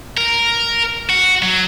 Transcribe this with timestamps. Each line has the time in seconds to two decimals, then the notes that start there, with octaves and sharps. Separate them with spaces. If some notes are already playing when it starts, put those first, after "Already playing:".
0.17 A#4
1.09 F#4
1.42 F#3